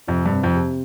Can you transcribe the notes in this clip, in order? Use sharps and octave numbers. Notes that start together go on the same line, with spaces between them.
F2 C3
G2
C3
F2
G4